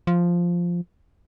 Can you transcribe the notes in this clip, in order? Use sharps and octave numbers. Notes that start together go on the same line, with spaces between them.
F3